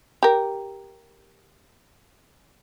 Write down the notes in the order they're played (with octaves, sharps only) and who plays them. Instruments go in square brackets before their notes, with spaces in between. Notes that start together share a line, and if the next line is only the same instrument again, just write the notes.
[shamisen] G4 A#4